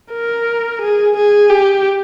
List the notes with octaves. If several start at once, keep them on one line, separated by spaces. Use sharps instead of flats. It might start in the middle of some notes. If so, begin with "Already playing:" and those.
A#4
G#4
G#4
G4